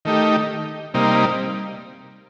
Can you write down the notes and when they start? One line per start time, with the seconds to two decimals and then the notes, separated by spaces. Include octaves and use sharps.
0.05 D#3 A3 D#4 G4
0.94 C3 G3 A#3 D#4